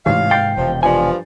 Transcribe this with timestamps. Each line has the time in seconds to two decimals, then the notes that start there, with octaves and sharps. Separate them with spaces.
0.06 A1 G#2 C3 E3 F5
0.31 G5 G6 A6 C7
0.57 E1 C3 F3
0.83 G2 F3 D5 G#5